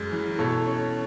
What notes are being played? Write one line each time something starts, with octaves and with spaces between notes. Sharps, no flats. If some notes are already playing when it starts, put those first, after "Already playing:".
Already playing: F#2 G#3
E3
B2 A4 C#5
C#4